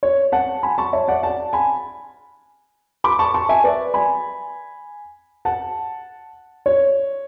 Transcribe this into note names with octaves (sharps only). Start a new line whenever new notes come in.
C#5
F#5 A5
G#5 B5
A5 C#6
C#5 E5
D5 F#5
F#5 A5
G#5 B5
B5 D6
A5 C#6
A5 C#6
E5 G#5
B4 D5
G#5 B5
F#5 A5
C#5